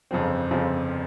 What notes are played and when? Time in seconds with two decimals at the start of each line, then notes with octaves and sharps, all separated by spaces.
0.11 G1 F2 C#3 F3 C4
0.51 G1 F2 C#3 F3 C4